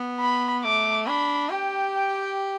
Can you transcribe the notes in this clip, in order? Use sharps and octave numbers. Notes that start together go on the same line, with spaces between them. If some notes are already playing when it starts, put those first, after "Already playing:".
Already playing: B3
B5
A3 D6
D4 B5
G4 G5
G5